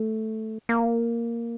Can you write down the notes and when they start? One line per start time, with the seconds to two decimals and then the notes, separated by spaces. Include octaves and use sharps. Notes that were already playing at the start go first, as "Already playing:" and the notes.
Already playing: A3
0.69 A#3